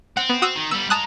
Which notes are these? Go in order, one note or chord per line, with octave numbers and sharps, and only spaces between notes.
C4 F#5
B3
F#4 D#6 E6
D#3
G3 B3 E6
G#3 A5 A#5 D#6 F#6